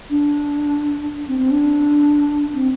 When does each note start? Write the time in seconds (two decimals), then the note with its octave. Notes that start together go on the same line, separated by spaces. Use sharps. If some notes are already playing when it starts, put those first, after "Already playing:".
0.10 D4
1.28 C4
1.39 C4
1.50 D4
2.54 C4